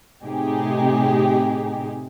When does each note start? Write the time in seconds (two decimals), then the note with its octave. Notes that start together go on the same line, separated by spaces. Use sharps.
0.23 A2 C3 D#4 G4 G#4